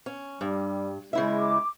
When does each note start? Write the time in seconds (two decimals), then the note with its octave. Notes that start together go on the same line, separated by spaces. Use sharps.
0.06 C#4
0.41 G2 G3
1.13 C#3 G#3 E4 E5
1.37 D6